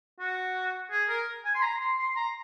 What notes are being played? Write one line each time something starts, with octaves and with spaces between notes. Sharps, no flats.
F#4
G#4
A#4
G#5
C6
A#5
C6
C6
A#5